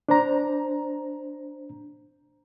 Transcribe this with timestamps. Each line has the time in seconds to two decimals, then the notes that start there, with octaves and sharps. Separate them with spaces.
0.09 D4 C5 A#5